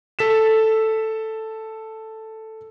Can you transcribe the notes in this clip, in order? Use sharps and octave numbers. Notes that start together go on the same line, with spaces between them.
A4 B6 E7